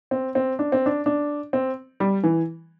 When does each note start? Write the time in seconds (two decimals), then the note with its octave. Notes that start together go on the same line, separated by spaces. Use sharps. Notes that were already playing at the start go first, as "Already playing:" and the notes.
0.11 C4
0.35 C4
0.59 D4
0.72 C4
0.86 D4
1.06 D4
1.53 C4
2.00 G3
2.24 E3